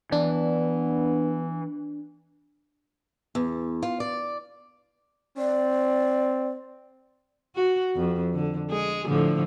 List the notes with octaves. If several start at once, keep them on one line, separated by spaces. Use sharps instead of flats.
E3 B3 D4
E2
F4
D5
C4 D5
F#4
F2
D3
G#3 G#4
A2 D3 F3